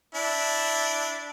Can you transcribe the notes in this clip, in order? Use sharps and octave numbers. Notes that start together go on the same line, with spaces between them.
D4 E4